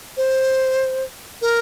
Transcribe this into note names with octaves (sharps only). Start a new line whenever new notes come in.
C5
A#4